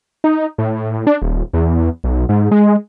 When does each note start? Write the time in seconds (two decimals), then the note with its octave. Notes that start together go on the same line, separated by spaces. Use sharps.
0.24 D#4
0.58 A2
1.07 D4
1.22 D#1
1.54 E2
2.04 B1
2.29 G#2
2.51 G#3